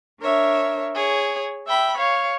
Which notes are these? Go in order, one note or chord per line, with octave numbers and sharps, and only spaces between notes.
D4 A#4 C#5 E5
G#4 C#5
E5 G5 B5
C#5 F5